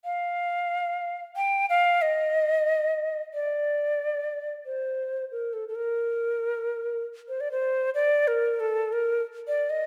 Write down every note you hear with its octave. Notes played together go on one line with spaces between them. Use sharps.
F5
G5
F5
D#5
D5
C5
A#4
A4
A4
A#4
C5
D5
C5
D5
A#4
A4
A#4
D5
D#5